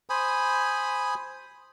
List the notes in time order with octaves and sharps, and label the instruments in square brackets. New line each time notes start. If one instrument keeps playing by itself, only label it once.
[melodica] C5 G#5 B5 D#6